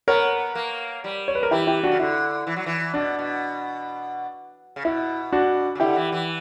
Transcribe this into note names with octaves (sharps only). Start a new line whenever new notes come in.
B3 A#4 C#5
A#3
G3
C#5
B4
A#4
E3 E4 G4
E4 G4
D4 F#4
C#3
D3 E4
E3
F#3
E3
B2 D4
B2
C#3
B2 E4
D4 F#4
C#3
D3 E4 G4
E3
E3